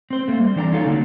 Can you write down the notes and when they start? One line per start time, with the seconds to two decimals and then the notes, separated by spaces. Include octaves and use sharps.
0.10 C4 C5
0.28 A3 A#3
0.39 G3
0.56 E3 D4 G5 A#5
0.72 C#4 D#4 F4 A4
0.86 D3 F#3 A#3 D4